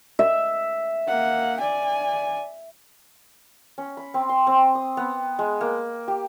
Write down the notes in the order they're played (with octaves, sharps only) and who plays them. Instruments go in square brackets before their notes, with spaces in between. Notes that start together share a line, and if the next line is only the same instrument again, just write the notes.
[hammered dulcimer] E5
[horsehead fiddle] A#3 F#5
D5 G#5
[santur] C#4
B5
C4
C6
C4
D#6
B3
G#3
A#3
G4